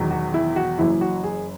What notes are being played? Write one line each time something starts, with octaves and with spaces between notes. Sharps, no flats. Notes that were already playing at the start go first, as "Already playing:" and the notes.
Already playing: E1 E2 D#3 F#3
F#4
E4
F#4
F#1 F#2 E3 E4
F#4
G#4